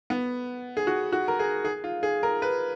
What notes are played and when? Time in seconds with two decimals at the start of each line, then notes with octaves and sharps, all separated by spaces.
0.10 B3
0.77 G#4
0.87 F#4
1.12 F#4
1.28 A#4
1.39 G#4
1.65 G#4
1.84 F4
2.03 G#4
2.23 A#4
2.42 B4